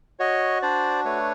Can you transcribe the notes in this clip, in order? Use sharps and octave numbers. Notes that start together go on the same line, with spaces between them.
F#4 C#5 D#5
D4 C5 D5
A3 B4 C#5